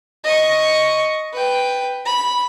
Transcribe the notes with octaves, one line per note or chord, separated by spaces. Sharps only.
D#5 C#6
B4 G5
B5